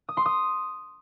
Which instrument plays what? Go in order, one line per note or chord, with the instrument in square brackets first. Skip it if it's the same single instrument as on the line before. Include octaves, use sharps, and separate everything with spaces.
[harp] D#6
C6
D#6